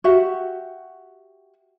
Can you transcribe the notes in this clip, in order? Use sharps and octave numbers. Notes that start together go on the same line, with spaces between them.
F#4 G4 E5 F#5